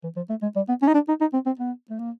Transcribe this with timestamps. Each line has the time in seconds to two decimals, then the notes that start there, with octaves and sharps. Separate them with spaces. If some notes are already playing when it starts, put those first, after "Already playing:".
0.04 E3
0.16 F3
0.29 A3
0.42 G#3
0.56 G3
0.69 B3
0.82 C#4
0.88 D#4
0.94 D4
1.08 D#4
1.21 D#4
1.34 C4
1.46 C4
1.60 B3
1.90 A3
1.99 A#3